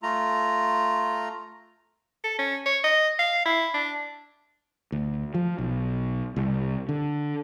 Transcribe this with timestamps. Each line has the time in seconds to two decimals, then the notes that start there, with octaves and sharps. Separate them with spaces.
0.03 A3 F4 A#5
2.24 A4
2.39 C#4
2.66 C#5
2.84 D#5
3.19 F5
3.46 E4
3.74 D4
4.92 D2
5.34 F3
5.58 B1
6.36 C2
6.89 D3